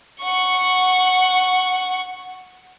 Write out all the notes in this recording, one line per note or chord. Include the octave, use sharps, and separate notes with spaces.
F#5 C#6